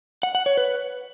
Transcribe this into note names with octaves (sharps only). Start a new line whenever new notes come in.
F#5
F#5
C#5
B4